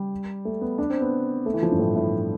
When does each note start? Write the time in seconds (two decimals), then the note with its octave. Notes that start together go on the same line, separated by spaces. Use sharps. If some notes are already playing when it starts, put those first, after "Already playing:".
Already playing: G3
0.45 A3
0.61 B3
0.78 D4
0.90 C4
1.01 B3
1.46 A3
1.54 E3
1.63 F3
1.71 G2
1.79 A2
1.96 A2